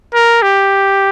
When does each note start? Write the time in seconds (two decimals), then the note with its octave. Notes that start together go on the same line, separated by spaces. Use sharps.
0.14 A#4
0.42 G4